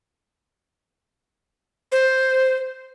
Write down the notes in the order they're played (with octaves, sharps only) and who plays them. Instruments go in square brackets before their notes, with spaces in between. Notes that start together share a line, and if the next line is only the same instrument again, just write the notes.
[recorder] C5